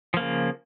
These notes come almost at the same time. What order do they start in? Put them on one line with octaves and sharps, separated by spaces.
F3 A#3 C#3